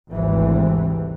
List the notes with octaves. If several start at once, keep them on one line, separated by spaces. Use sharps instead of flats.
G#1 D2 C3 E3 G3 C4